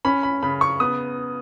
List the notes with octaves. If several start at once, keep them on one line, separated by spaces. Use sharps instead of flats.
C#4 B5
B5
C#3 B5
C#6
B3 D#6